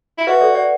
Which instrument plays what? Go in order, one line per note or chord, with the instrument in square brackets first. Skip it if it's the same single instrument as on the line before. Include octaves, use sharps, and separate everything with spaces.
[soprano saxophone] E4
[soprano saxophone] F#4 [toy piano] B4 E5
[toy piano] A4 D5
D5 F#5